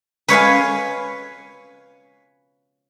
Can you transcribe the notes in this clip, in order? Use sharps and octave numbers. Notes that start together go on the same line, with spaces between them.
B4 C#5 F5 G#5